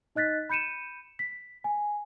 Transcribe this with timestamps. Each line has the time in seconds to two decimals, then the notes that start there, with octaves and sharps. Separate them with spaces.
0.15 D#4 D#5 F#6 A6 B6
0.50 B5 G6 C#7 D#7 E7
1.19 B6
1.64 G#5